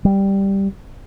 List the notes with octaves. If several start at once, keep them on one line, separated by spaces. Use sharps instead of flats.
G3